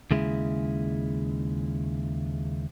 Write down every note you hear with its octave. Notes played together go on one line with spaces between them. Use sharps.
D#2 C#3 G#3 E4